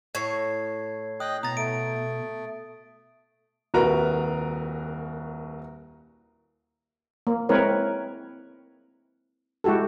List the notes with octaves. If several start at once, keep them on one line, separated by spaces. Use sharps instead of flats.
A2 C#5 G#6 C7
D#5 G5 D#6 F#6
B2 A#5 D#6 A6
A3 D7
D#1 C2 F#4 A#4 B4 A#5
A#3
G#3 C4 E4 A#4 B4 C#5
G#3 E4 F#4 G4 A4